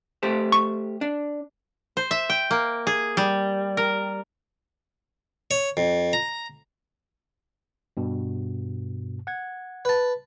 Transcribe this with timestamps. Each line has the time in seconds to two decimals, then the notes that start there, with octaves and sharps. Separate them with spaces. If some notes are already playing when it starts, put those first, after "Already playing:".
0.23 A3 G4 C5
0.52 C#6
1.01 D4
1.97 C5
2.11 E5
2.30 G5
2.51 A#3
2.87 G#4
3.17 G3
3.77 A#4
5.51 C#5
5.77 F2
6.13 A#5
7.97 G2 B2
9.27 F#5 G#6
9.85 B4 A5